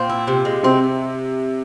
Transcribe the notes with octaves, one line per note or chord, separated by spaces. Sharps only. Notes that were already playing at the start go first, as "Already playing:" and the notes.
Already playing: A#2 C4
E4
C3
G#3
C3 C4